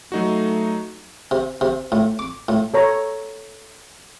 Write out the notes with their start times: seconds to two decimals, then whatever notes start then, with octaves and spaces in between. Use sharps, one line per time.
0.12 F#3 A3 D#4 F#4
1.31 C3
1.61 C3
1.92 A2
2.19 D6
2.49 A2
2.74 A4 C#5 A#5